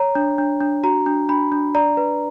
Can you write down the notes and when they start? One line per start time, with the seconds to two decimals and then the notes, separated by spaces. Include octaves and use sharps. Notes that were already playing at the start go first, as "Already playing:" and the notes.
Already playing: C#5 A#5
0.15 D4
0.38 D4
0.61 D4
0.83 F#4 A#5
1.06 D4
1.29 D4 B5
1.52 D4
1.75 D5 A#5
1.97 B4